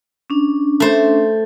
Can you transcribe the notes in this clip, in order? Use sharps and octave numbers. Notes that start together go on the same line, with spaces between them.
C#4 D4
A3 C5